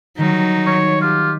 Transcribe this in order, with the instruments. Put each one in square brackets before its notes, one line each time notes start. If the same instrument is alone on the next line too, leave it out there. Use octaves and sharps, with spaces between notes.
[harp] D#3 G3 [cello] F#3 [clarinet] D#4
[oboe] C#5
[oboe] F4 [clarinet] G4